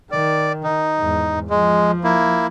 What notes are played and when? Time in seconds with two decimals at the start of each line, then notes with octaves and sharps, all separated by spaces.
0.12 D#3 D5
0.64 D#4
0.98 E2 G#2
1.50 F3 G#3
2.04 A#3 E4